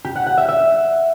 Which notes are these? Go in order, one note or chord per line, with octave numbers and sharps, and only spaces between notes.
G4
F#5
F#5
E5
E5